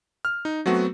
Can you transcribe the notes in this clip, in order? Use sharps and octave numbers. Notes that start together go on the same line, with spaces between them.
F6
D#4
F#3 A3 B3 C4 F#4